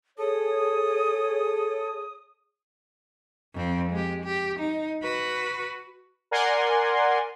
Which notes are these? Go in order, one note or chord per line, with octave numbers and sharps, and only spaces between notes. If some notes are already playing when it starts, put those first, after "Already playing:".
G#4 A4 C#5 D#6
F2 C4
G#3 G4
G4
D#4
F#4 B4
A#4 D5 F#5 G#5 C6